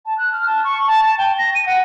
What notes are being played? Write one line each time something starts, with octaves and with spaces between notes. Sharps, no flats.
A5
F#6
F6
A5
C#6
A5
A5
G5
A#6
D#7
F#5